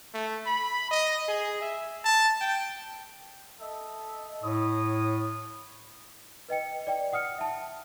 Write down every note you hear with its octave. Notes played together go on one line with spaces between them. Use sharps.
A3
B5
D#5
G#4
E5
A5
G5
A4 D#5 E5
A2 C#5 B5 D#6
B4 D#5 G5 C#7
D5 G5
F#5 D#6 F6 C#7
E5 A5